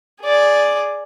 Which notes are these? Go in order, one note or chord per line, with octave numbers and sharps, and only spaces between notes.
G#4 D5